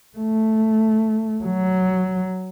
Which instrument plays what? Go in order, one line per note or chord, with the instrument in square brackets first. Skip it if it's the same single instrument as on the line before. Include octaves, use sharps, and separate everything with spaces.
[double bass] A3
F#3